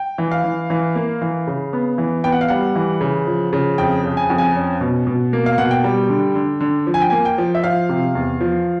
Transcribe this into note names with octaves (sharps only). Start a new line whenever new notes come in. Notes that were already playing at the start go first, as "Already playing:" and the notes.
Already playing: G5
E3
F5
E3
E3
A#3
E3
C#3
B3
E3
B3 G5
F#5
F5
G3 F#5
E3
C#3
F3
C#3
F2 G5
C#3
G#5
F2
G#5
C#4
B2
B2
A#3
F5
B2 F#5
G5
G3
D3
D3
D3
F3
G#5
G5
A#3 G#5
G5
F3
E5
F3 F5
C3
E2
F3